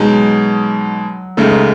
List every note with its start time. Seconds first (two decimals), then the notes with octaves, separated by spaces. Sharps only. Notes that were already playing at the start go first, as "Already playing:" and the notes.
Already playing: B2 F#3 G#3 D#4
1.37 C#2 C#3 G#3 A3 D#4 A4